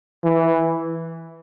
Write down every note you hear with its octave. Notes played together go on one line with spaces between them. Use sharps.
E3